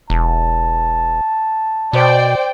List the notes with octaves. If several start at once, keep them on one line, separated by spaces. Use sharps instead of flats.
E1 A5
B2 C5 D5 G5